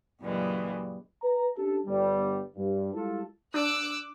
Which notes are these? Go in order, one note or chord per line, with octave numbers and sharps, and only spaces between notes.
F#2 A#2 C#3 E3 G3 G#3
B4 A#5
C#4 D4 G4 A4
G1 G3
G2
G3 G#3 E4 F4 A4
D4 D6 E6 F#6